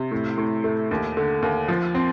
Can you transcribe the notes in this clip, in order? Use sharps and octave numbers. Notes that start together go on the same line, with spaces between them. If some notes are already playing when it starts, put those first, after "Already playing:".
Already playing: C3
A2
A2
A3
D#2
D3
D#2
F3
C4